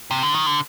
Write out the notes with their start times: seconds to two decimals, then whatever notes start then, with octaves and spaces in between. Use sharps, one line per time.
0.11 C3
0.23 D3
0.34 D#3
0.46 D3